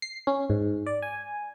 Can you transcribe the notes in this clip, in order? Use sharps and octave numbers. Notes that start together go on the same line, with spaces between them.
C7
C#4
G#2
D5
G#5